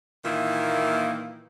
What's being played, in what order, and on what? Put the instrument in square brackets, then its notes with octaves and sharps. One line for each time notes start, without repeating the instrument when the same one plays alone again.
[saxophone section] A#2 D#3 E3 A#3 E4